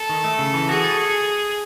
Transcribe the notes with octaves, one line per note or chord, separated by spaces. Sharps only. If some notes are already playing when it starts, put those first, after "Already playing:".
Already playing: A4
D#3
A3
C#3
E3
F#4 G#4
A4